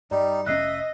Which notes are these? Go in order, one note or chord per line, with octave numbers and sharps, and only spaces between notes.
G2 G3 D#4 D5
F1 A#2 C#4 D#5 E5 F#6 C7